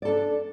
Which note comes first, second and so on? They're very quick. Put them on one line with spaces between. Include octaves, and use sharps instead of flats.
D5 A4 D4